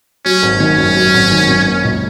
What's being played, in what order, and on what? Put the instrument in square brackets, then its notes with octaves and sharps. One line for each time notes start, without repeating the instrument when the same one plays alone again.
[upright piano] F#3 [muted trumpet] C#4
[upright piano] G#1
[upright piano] D#3 [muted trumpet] C#4
[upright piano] F#2
F#3
G#1
D#3
F#2
A#3
C#2